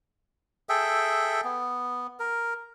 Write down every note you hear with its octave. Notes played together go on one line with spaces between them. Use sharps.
G#4 A4 E5 G5
B3
A#4